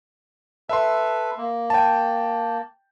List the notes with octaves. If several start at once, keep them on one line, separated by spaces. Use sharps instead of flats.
A4 B4 E5 C6
A#3
G5 A5